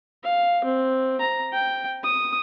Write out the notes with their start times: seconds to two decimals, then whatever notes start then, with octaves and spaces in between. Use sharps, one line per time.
0.23 F5
0.64 C4
1.20 A#5
1.53 G5
2.03 D#6